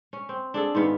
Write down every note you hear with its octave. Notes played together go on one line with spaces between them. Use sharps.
C#4
C4
D4 G#4 A4
G#2 D#3 B3 F5